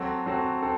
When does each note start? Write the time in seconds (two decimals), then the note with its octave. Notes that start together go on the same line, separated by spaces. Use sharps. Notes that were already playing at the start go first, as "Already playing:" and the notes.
Already playing: F#3 C4 F#4 A4
0.26 F#3 C4 F#4 A4
0.62 C4 A4